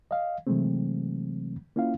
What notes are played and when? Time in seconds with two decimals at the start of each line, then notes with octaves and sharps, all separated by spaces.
0.11 D#5 F5
0.47 C3 E3 F#3 G#3 A3 C4
1.76 A#3 C#4 E4 F4 F5